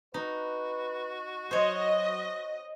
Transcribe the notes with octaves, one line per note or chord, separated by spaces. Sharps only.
D#4 F#4 B4
F#3 C5 C#5 D#5